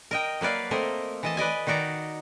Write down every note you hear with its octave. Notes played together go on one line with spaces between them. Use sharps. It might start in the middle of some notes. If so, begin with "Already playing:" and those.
A#4 D#5 G5
F#3 A#3 B4 D5 F5
A3 A#3 C4 A#4 D#5
E3 D#5 A5
B4 D5 D#5 G#5
D#3 D#4 F#4 D5 A#5